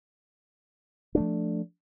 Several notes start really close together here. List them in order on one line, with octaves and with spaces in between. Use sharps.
D4 A3 F3